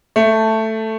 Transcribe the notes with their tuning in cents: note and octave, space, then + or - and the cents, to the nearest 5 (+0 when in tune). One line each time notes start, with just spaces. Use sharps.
A3 +5